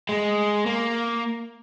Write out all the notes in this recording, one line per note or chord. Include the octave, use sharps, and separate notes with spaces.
G#3
A#3